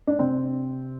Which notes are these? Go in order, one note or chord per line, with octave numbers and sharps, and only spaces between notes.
D4
C3 C4